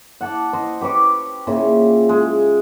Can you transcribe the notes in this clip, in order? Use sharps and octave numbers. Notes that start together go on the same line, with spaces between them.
F#5 A5 D6
C5 D#5
G4 B4 C#6 D6
A#2 C#3 F4 E5
G#3